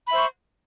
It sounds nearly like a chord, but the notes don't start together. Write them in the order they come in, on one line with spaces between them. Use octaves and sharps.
B5 E5 C5 C#6